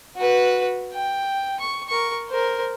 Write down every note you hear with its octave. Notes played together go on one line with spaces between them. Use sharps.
F#4 B4
G5
C#6
A#4 C#6
A#4 C5